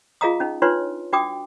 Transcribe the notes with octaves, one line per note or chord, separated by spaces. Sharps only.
F4 G#4 D#5 F5 A#5 D#6
C#4 D#4
D4 D#4 F4 B4 C#5 C6
D4 F#4 G5 D6 D#6